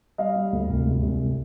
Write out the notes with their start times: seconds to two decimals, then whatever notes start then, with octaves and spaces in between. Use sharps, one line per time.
0.18 G3 D#5 F5
0.36 G3
0.53 D2
0.70 C2
0.86 G#3
1.03 C2